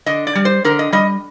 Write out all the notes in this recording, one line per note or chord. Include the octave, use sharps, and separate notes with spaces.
D3 D#5
D5
G3
C5
D3 A#4
D#5
G3 D#5